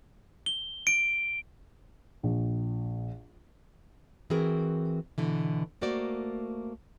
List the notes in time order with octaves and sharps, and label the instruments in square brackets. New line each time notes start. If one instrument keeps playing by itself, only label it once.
[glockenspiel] G7
D7
[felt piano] A#1
[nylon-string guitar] E3 C4 F#4 G#4 A#4
B2 D3 E3
A3 A#3 F#4 C5 D5